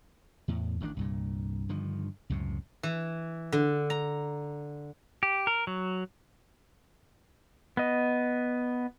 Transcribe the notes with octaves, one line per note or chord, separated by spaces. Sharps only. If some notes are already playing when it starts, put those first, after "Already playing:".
E2 A2
A1 D#3 G#3 D4
C2 G2 A#2
G2 D3 D#3 F3
C#2 F#2 A2 C3
E3
D3
A#5
G4
A#4
F#3
B3 D#5